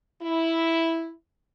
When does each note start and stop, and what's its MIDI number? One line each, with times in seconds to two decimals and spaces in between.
0.21 1.11 64